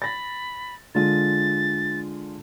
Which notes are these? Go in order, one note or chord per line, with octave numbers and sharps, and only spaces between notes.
B5 A6 A#6
D3 G#3 F4 A6